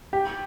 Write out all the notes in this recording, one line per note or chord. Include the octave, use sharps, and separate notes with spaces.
G4